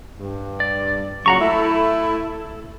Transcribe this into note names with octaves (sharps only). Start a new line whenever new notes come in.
G2
D5
A#2 C#3 F#3 F#5 A#5 C#6
A3 E4 A4